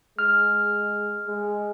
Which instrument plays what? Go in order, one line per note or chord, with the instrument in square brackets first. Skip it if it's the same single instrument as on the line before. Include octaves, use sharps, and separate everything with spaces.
[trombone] G#3 [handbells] F6
[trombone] G#3